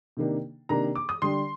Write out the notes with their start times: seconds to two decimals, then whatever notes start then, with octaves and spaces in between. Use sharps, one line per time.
0.17 C3 D#3 A#3 D4
0.69 C3 D#3 A#3 D4 A#5
0.95 D6
1.09 D#6
1.22 D3 G3 D4 C6